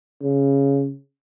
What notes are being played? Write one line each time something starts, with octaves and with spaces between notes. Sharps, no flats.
C#3